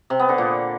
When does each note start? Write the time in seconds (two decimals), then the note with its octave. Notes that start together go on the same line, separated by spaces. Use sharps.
0.10 C3
0.19 B3
0.29 D3
0.38 A#2